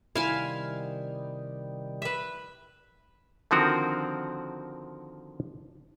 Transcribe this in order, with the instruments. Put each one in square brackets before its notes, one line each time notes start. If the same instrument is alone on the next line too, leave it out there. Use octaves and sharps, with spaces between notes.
[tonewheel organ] C3 D#3 G3 [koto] E4 E5 [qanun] F5 G#5 C6
[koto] B4 E5
[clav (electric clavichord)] D3 D#3 F3 C4 F#4 A#4